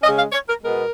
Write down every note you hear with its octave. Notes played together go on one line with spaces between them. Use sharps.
C#3 G#3 C#4 D#5
F5
C#5
A#4
B2 G#3 B3 A#4